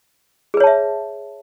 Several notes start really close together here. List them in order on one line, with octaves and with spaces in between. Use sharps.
G#4 B4 C#5 A5 E5